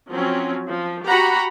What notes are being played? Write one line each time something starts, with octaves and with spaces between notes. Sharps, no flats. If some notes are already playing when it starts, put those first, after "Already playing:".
F3 F#3 C4 C#4
F3
F#4 G4 F#5 A#5 B5